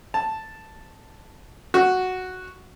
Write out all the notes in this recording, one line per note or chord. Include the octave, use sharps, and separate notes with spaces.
A5
F#4